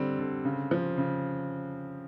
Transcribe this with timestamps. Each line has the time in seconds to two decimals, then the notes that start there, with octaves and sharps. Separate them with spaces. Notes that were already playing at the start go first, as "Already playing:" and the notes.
Already playing: D3 G3 C4
0.19 D3
0.45 C#3
0.71 F3
0.98 C#3